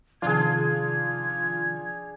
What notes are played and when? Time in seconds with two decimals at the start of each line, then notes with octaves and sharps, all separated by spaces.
0.22 C3 D#3 F3 D4 F4 G#4 G#6